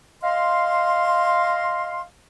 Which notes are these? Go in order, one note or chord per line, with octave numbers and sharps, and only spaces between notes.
D#5 F5 C6